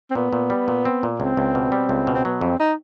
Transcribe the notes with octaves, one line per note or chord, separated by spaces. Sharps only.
C4
A#2 B3
A#2
G3
A#2
C4
A#2
C#2 C4
C#2
B2
G3
C#2
B2
C4
F#3 B3
F2 C4
D#4